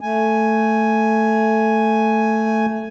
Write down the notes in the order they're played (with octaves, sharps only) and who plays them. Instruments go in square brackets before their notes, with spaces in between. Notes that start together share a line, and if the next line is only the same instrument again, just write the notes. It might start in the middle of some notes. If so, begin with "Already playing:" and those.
[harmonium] A3 G#5